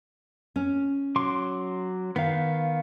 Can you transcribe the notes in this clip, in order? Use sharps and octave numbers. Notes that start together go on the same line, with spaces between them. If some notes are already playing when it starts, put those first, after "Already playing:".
C#4
F#3 C6 D6
D#3 B3 F5